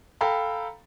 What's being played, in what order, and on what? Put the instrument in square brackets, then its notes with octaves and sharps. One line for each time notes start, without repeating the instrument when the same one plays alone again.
[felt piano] A4 F5 G5 A#5 B5